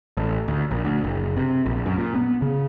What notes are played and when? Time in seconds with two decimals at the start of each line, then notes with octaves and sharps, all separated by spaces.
0.17 A1
0.48 D2
0.71 A#1
0.84 D2
1.04 F#1
1.37 C3
1.66 A#1
1.86 F#2
1.98 A#2
2.15 B3
2.42 C#3